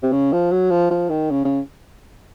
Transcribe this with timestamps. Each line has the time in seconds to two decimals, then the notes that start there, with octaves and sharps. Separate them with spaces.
0.03 C3
0.12 C#3
0.32 F3
0.51 F#3
0.70 F3
0.91 F3
1.10 D#3
1.30 C#3
1.44 C#3